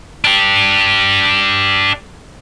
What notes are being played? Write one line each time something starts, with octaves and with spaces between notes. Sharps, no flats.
D4 G4